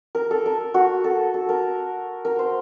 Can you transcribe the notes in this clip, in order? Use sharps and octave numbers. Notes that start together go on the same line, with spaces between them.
A#4
A4
A#4
F#4
A4
A4
A#4
A#4
C5